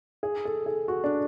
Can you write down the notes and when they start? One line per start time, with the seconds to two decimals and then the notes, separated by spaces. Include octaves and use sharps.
0.23 G#4
0.45 A4
0.66 G#4
0.88 F#4
1.04 D4